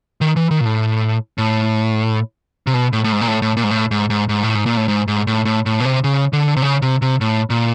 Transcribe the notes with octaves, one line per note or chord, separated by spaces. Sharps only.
D#3
E3
D#3
A#2
A2
A2
C3
B2
A2
A2
G#2
A#2
A2
A2
A#2
G#2
A2
G#2
G#2
G#2
A2
G#2
A#2
A2
G#2
G#2
A2
A2
A2
B2
C3
C#3
D3
C3
C#3
C3
C3
A2
A#2